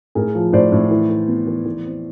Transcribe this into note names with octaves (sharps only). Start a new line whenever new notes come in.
A2 G#4 A#4
F3
A2 C5 D5
A2
E3
E3
B3
E3
E3
C4